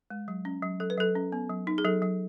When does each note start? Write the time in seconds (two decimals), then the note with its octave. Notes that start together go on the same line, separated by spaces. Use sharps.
0.10 G#3
0.28 F#3
0.45 C#4
0.63 F#3
0.80 F#3 A4
0.90 B4
0.98 F#3 A4
1.16 C#4
1.32 B3
1.50 F#3
1.67 D#4
1.78 G#4
1.85 F#3 A4
2.02 F#3